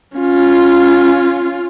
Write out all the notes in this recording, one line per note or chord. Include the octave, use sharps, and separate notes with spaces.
C#4 F4